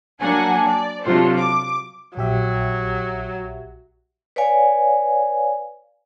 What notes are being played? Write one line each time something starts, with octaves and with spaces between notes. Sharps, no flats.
F#3 A#3 D4 F#5 G#5
D5
C3 F#3 D4 F4 A4 C5
D6
A#1 F#3 G4 E5
B4 C#5 D5 F5 G#5